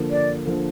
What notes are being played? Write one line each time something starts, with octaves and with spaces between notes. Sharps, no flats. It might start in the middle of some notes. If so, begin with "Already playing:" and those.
Already playing: D3 F3 A#3
D5
D3 F3 A#3